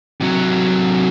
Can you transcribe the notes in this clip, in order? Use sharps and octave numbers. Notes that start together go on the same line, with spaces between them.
C3 F#3